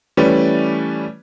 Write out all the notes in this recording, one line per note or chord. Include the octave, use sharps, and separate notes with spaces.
E3 G3 A3 C#4 B4 D5